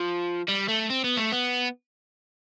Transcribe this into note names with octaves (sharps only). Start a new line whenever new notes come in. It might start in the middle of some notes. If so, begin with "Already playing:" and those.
Already playing: F3
G3
A3
C4
B3
A3
B3